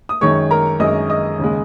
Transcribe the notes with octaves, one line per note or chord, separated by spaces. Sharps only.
D#6
F#2 D#3 G#3 C#5 C#6
A#4 A#5
F#2 D#3 G#3 D#5 D#6
D#5 D#6
D#2 C#3 G#3